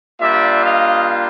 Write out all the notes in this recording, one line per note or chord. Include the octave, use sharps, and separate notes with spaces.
G3 A#3 D4 F4 D5 E5
D#5 F5